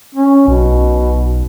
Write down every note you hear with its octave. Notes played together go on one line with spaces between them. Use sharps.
C#4
B1 B2